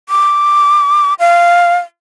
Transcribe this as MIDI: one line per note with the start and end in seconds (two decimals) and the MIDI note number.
0.09 1.14 86
1.20 1.77 77